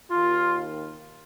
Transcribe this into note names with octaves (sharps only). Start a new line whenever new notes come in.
D#2 D#3 F4